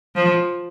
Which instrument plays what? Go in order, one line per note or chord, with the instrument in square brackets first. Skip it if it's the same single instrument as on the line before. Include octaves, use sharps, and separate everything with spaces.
[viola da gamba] F3